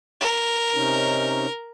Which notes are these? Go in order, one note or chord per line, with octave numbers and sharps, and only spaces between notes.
A#4
C3 C#4 D#4